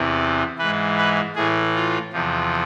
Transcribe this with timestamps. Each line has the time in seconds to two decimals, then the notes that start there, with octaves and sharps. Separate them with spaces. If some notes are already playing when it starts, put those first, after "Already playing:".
Already playing: E2 C3 E3
0.58 G#2 E3 B4
0.97 B4
1.35 A2 E3 G#4
1.75 F4
2.13 E2 C3 F3